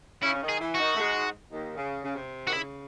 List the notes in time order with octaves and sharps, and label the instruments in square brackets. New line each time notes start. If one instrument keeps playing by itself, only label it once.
[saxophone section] C#3 C#4 [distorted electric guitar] E4
[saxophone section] C#4
D#3 D#4
[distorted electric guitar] G#4
[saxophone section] E3 E4
[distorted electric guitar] F#4
[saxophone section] D#3 D#4
A3
G#2 G#3
D#2 D#3
C#3
C#3
C3
[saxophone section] D#3 [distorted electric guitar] F#4
[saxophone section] C#3 [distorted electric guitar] E4